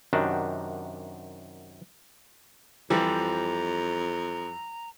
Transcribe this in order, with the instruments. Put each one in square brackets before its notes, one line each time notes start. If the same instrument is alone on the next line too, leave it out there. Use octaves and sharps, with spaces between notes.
[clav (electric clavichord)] F#2 C3 D#3 D4 F#4 G4
[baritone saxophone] F2 [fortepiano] E3 F3 G3 [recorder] A#5